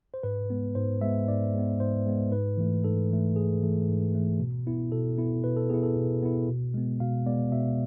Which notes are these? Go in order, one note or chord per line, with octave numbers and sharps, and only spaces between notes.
C5
G#2 B4
G#3 B3
G#2 C5
G#3 B3 E5
G#2 D5
G#3 B3
G#2 C5
G#3 B3
G#2 B4
E3 A3
G#2 A4
E3 A3
G#2 G#4
E3 A3
G#2
E3 A3
B2
B3 E4
B2 A4
B3 E4
B2 B4
A4
B3 E4 G#4
A4
B2
B3 E4
B2
G#3 B3
B2 F5
G#3 B3 D5
B2 E5